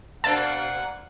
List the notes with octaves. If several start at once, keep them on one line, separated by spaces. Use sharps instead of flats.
B2 A#3 D4 F5 F#5 A5